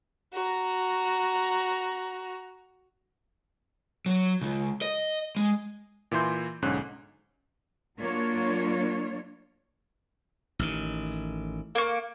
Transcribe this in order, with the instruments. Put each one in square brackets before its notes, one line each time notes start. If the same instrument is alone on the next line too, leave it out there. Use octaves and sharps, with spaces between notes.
[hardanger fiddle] F#4 A#5
[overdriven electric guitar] F#3
C#2
D#5
G#3
[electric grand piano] A#2 E3 E4 C6 G6
B1 G#2 D3 C#4 F#6
[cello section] F#3 A#3 D4 F4 C#5
[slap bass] A1 D#3
[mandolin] A#3 C#6